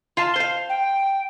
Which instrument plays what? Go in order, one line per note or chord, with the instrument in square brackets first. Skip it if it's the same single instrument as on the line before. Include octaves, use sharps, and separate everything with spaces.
[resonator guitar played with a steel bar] F4 F5 A5
C5 F5
[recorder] G5